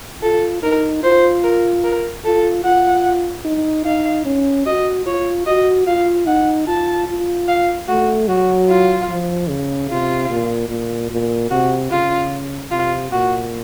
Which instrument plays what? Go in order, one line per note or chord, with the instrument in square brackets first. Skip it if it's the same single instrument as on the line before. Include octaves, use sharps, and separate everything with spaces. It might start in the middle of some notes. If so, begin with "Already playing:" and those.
[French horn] F4 [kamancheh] A4
[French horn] D#4 [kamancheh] A#4
[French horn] F4 [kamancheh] C5
[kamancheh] A#4
A#4
[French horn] F4 [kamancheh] A4
[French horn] F4 [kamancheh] F#5
[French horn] D#4
[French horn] D#4 [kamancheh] F5
[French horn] C#4
[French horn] F#4 [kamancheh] D#5
[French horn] F4 [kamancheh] C#5
[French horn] F#4 [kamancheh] D#5
[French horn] F4 [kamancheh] F5
[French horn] D#4 [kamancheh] F#5
[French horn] F4 [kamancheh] A5
[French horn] F4
[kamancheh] F5
[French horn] A3 [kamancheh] F#4
[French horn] F#3 [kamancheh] F#4
[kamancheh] F4
[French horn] F3
C#3
[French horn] C3 [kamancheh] F4
[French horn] A#2
A#2
A#2
[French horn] C3 [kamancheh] F#4
[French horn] C#3 [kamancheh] F4
[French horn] C3 [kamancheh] F4
[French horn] A#2 [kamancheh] F#4